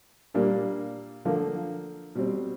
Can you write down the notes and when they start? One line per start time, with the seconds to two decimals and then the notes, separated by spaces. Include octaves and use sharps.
0.34 A#2 G3 A#3 D4
1.25 D3 F3 A#3
2.15 B2 G3 C4